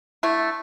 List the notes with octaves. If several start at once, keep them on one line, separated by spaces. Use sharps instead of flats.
D3 A3 E4